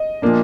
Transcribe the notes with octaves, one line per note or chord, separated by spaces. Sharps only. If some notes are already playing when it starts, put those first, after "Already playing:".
Already playing: D#5
A#2 F3 A#3 D4